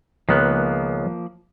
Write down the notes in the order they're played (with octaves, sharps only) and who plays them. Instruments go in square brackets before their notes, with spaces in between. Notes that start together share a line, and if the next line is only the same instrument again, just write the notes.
[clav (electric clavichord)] C#2 D#3 B3 [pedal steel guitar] F3 A#3 F#6